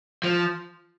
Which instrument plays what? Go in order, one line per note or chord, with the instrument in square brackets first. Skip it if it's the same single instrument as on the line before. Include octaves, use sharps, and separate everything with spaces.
[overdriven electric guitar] F3